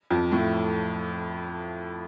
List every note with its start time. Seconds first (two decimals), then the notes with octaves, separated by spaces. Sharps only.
0.10 F2 F3
0.32 A2 A3